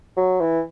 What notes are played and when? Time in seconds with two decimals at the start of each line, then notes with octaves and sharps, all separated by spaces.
0.17 F#3
0.40 E3